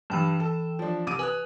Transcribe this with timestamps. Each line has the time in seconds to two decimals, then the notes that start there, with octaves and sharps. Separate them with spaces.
0.10 G2 E3 G5 E7
0.40 A4
0.79 F3 D4
1.07 C2 D6 D#7
1.19 B4 G#5 D#6 F#6